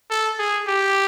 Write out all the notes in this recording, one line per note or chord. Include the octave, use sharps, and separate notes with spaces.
A4
G#4
G4